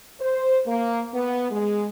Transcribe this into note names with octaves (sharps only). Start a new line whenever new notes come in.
C5
A#3
B3
G#3